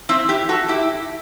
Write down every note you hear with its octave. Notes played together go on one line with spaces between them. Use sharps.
C4 E4
E4 G4
F#4 A4
E4 G4